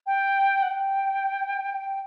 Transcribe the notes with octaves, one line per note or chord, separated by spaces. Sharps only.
G5
F#5
G5